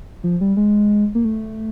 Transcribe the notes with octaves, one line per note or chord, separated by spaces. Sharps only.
F3
G3
G#3
A#3
A3